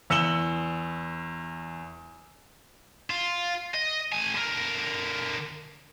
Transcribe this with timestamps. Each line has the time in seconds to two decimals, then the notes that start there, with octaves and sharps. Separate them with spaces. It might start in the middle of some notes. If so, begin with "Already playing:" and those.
0.10 E2 E6 C#7 E7 F#7 G7
3.10 F4
3.75 D#5
4.12 A3 G#5
4.35 D3 A#4